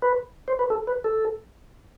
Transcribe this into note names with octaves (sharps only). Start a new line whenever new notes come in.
B4
C5
B4
A4
B4
A4